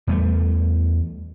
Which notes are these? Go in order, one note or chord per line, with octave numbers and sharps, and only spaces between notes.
E2 G3 A3